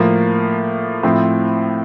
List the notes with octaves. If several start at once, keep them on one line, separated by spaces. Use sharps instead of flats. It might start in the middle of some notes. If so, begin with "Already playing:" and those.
Already playing: A2 F3 A#3
A2 F3 C4 E4